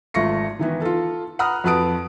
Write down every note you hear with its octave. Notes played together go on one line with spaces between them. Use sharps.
G#1 A3 F4 C#6 A#6 C#7
D#3 E3 B3
F4 A4
F#5 A#5 B5 D#6 F6 F#6
F2 F#4 B4 A5 D#6 D7